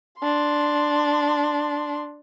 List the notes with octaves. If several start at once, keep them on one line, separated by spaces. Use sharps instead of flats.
D4 C6